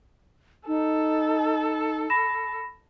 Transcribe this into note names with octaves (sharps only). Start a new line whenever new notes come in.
D#4 A4
B5 A#6 E7